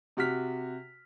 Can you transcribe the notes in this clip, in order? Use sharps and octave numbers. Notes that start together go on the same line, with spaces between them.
C3 F#4 F6 B6